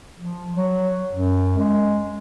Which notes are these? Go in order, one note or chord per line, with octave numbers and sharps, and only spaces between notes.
F3
F#3
F#2
G#3